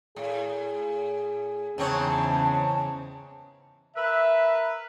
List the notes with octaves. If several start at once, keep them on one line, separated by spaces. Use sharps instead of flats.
A2 G#4
E2 G#2 C#3 C4 C#5 A5
A#4 B4 E5